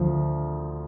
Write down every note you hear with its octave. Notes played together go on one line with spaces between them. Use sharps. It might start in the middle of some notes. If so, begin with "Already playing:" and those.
Already playing: D2 F3